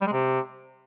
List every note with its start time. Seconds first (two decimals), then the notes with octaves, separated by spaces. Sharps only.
0.01 G3
0.07 G#3
0.12 C3